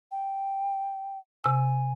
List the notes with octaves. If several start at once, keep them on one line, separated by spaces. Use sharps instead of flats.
G5
C3 G#5 E6